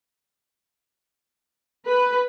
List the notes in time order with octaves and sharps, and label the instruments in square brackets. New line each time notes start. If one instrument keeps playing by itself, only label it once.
[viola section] B4